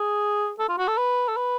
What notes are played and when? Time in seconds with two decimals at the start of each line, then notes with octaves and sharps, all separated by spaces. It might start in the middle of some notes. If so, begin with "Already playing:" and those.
Already playing: G#4
0.59 A4
0.69 F4
0.78 F#4
0.88 A4
0.97 B4
1.28 A4
1.37 B4